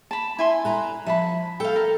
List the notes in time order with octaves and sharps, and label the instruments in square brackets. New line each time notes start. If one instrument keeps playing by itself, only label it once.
[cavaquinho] A5 B5
E4 G#5 C6
[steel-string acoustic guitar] B4 A#5
[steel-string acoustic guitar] F3 [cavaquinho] E5 A5 B5
[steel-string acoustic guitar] A4 [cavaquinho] F5 G5
[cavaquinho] A#4